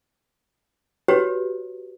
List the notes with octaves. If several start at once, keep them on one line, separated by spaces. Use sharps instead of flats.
F#4 G4 B4 C#5